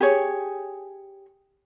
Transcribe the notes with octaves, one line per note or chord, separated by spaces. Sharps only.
G4 G#4 C#5